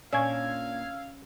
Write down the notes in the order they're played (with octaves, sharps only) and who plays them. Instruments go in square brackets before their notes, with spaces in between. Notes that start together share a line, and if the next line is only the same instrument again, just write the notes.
[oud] A#2 D4 [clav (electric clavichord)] C#4 [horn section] F5 [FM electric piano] E6 G#6